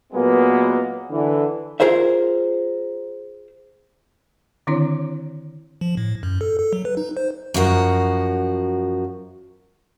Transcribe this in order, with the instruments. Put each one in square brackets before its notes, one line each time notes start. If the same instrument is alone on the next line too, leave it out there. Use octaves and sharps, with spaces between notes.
[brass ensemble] A#2 F#3 G#3 A#3 B3
D3 E3
[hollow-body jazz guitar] F4 G#4 A#4 C5 E5
[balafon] D3 D#3 C4 D4 E4 C#5
[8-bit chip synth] F3
A2
F#2
A4
A4
F#3
B4
D#4
C5
[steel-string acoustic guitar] F#2 F3 F#4 A#4